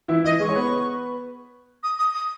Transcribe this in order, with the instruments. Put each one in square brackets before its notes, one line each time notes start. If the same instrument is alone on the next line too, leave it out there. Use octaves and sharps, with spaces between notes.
[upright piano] E3 E4
[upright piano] E3 E4 [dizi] D#5
[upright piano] G#3 G#4 [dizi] C#6
[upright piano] C#5
B3 B4
[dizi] D#6
D#6
D#6